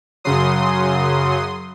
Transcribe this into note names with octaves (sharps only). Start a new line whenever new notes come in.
F#2 C#3 F#3 C6 D#6